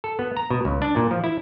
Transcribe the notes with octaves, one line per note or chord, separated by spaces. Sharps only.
A4
B3
A#5
B2
C#2
D4
A#2
F3
E4